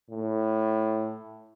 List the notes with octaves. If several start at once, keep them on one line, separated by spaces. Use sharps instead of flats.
A2